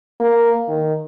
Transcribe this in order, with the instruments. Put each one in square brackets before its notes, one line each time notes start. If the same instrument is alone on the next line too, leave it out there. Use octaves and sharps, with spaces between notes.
[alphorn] A#3
D#3